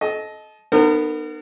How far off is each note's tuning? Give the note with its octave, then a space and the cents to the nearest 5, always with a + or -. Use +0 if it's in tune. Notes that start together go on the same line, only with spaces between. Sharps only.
A4 -30 D#5 +5
B3 +0 D#4 -35 A#4 -40